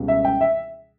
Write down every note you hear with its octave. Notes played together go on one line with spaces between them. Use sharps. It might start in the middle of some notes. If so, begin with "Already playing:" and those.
Already playing: C#2 B2 G3
E5
G5
E5